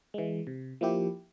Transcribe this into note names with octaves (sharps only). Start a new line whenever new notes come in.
E3 G#3
C3
F3 A#3 E4 G4